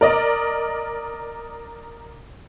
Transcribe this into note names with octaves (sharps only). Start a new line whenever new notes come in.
A#4 D5 D#5